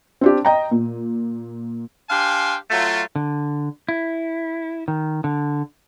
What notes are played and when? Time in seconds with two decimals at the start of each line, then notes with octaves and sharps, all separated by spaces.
0.21 C4 D4 G4
0.45 D#5 G5 A#5
0.71 A#2
2.10 D4 G4 F5 G5 G#5 C6
2.70 F#3 A3 F4
3.16 D3
3.89 E4
4.88 D#3
5.24 D3